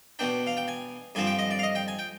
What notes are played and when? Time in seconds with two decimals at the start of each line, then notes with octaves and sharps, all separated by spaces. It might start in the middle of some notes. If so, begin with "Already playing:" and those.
0.19 B2 B3 D4 G5
0.47 F5
0.57 G5
0.68 G#5
1.15 G2 D3 F3 C4 G#5
1.27 G5
1.39 D#5
1.51 D5
1.59 F5
1.63 D#5
1.75 G5
1.88 G#5
1.99 G5